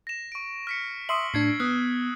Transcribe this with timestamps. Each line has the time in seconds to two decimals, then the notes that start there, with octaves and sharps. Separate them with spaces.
0.07 A#6 E7
0.32 C#6 D7
0.67 F6 B6 C#7
1.09 E5 C6 C#6 D#6 E6 F#7
1.34 A2 D4 G#6 C7
1.60 B3 D#6 F6 F#6